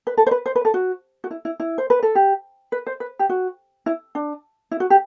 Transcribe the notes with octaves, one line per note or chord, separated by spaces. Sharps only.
B4
A4
C5
B4
C5
B4
A4
F#4
F#4
E4
E4
E4
C5
B4
A4
G4
B4
C5
B4
G4
F#4
E4
D4
E4
F#4
G4